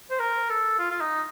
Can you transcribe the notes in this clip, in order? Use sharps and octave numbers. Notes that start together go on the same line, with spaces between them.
C5
A#4
A4
F4
F4
D#4